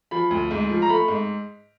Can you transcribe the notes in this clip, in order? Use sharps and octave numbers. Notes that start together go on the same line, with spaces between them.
F3 B5
D2
G#2
F3
A#5
A3 B5
G#2